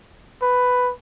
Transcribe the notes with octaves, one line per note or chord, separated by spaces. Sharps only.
B4